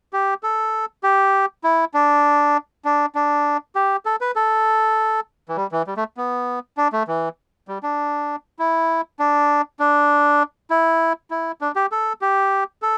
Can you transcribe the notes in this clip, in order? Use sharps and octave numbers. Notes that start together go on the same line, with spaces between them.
G4
A4
G4
E4
D4
D4
D4
G4
A4
B4
A4
E3
G3
E3
G3
A3
B3
D4
A3
E3
G3
D4
E4
D4
D4
E4
E4
D4
G4
A4
G4
A4